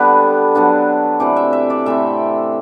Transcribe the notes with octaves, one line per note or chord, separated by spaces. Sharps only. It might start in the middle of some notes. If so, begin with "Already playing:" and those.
Already playing: D3 G3 B3 D4 B4
D3 F#3 B3 D4
C3 E3 A3 D4 D5
E5
E5
D5
A2 E3 A3 C4 E5